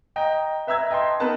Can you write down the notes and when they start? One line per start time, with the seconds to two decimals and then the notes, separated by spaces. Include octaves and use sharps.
0.16 D#5 G5 A#5
0.67 B4 E5 A#5 E6 G#6
0.91 D#5 G5 A5 C6
1.20 B3 D#4 A#4 B4 A5